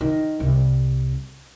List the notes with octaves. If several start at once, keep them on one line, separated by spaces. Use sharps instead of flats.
D#3
C2